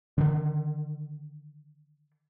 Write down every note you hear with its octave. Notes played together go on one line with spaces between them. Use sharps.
D3 D#3